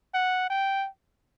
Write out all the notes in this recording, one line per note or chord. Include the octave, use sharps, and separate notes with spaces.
F#5
G5